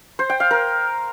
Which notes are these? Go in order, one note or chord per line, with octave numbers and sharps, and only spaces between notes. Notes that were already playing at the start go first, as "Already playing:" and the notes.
C5
G5
F5
A#4